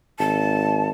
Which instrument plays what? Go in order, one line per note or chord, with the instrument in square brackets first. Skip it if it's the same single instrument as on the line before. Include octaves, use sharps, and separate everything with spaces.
[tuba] G#1 [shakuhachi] A5